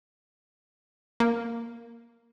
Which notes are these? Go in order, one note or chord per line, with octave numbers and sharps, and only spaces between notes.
A#3